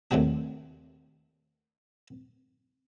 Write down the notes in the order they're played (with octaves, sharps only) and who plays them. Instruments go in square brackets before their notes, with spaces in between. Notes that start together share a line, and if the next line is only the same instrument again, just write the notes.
[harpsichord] D#2 A2 C3 F#3 D4